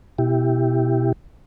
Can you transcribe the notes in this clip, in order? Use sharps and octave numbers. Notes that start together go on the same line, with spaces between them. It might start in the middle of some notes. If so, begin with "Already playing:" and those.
B2 E4 G4